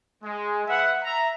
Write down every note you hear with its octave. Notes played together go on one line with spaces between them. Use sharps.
G#3
B4 E5 F#5
E5 A#5